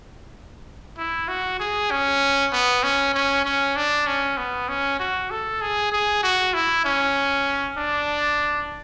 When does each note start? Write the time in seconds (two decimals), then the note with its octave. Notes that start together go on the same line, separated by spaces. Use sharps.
0.98 E4
1.28 F#4
1.60 G#4
1.91 C#4
2.52 B3
2.83 C#4
3.14 C#4
3.45 C#4
3.76 D4
4.07 C#4
4.37 B3
4.68 C#4
4.99 F#4
5.30 A4
5.61 G#4
5.92 G#4
6.23 F#4
6.54 E4
6.85 C#4
7.77 D4